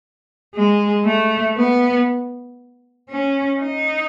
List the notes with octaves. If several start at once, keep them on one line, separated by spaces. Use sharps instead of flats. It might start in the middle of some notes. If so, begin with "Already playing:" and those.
G#3
A3
B3
C#4
D#4